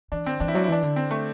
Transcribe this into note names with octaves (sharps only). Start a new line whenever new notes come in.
E3 D4
D3 C4
E3 D4
E4
F#3 D4
E4
E3 D4
D3
C4
A3